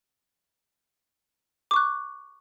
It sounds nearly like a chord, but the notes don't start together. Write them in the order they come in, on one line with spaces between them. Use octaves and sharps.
D6 C#6 F#6